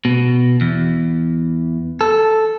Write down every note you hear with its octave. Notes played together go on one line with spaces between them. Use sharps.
B2
E2
A4